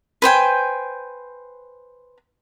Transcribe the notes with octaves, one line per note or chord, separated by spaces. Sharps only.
B4 C5 G5 G#5